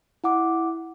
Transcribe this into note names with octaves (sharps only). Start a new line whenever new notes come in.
E4 F#5 D6